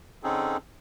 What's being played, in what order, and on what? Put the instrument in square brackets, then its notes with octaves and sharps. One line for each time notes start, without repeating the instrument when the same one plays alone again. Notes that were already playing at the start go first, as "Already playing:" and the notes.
[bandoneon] D3 C4 C#4 D#4 G#4 A4